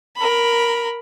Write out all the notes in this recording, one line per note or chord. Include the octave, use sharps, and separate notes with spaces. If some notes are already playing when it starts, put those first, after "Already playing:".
A#4 B5